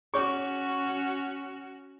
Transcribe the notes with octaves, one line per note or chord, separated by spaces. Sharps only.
C#4 F#4 G#4 C#5 C#6